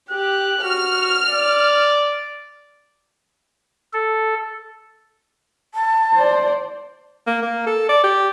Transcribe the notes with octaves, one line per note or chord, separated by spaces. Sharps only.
G4 F#6
F#4 F6
D5
A4
A5
C5 D5
A#3
A#3
A4
D5
G4